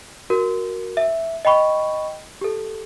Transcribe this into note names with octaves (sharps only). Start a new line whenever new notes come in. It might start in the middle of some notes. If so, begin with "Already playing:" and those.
F#4 A#4
E5
D#5 G5 B5 C#6
G4 A4